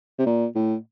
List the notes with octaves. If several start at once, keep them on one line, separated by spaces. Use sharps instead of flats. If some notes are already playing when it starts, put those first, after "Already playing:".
C3
A#2
A2